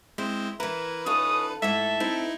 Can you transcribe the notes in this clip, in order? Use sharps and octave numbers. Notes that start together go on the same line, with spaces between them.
G#3 C4 E4 C5
E3 E4 A#4 B4
C#4 D#4 F4 A4 D#6
G#2 A3 E4 A4 E5
C4 D#4 E4